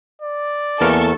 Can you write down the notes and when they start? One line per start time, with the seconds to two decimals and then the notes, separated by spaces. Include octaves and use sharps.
0.22 D5
0.81 E2 A#3 B3 A4 A#4 C#6